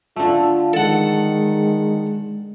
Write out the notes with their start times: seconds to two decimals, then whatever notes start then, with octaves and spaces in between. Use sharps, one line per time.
0.16 D3 A3 F4
0.73 D#3 G#3 A4 F#5